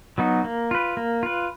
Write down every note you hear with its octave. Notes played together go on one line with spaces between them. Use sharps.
F#3 B3 D#4 F#4
A#3
F4 B4
A#3
F4 B4